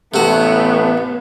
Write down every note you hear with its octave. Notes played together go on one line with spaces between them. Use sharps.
A1 C3 A3 B3 F#4